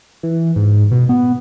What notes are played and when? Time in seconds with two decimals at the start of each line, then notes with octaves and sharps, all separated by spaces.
0.23 E3
0.56 G#2
0.91 B2
1.09 B3